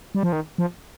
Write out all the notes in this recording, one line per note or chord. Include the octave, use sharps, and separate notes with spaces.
G3
F3
D#3
F3